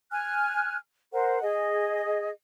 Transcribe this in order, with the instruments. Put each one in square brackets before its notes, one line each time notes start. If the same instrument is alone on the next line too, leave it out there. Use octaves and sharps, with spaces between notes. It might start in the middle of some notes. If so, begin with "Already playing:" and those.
[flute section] G#5 F6 F#6
A#4 C5 F#5
G#4 D#5